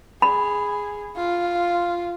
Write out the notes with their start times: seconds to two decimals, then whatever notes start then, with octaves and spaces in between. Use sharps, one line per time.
0.22 G#4 B5
1.17 F4